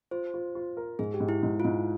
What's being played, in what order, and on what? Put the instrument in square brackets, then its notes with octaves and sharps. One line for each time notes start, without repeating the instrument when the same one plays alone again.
[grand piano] F4 [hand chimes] C5
[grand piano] F4
F4
A#4
[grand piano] G#2 [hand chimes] G#4
[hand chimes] G4
[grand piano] G#2
[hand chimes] E4
[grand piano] G#2
[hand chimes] F4
[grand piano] G#2 [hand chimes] E4